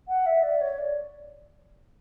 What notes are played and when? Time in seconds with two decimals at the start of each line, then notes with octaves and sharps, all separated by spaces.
0.08 F#5
0.26 E5
0.43 D5
0.61 C#5
0.78 D5